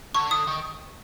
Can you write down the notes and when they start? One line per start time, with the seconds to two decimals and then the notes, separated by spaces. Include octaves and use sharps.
0.14 D3 C#6
0.31 D#6
0.47 D#3